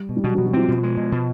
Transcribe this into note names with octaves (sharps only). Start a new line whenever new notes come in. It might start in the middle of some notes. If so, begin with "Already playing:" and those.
Already playing: G3
B2
G3
B2 F#3
F#3
B2
F#3
F3 C4
B2
G#3
B2
B2